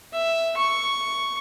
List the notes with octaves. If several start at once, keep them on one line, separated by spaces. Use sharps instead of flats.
E5
C#6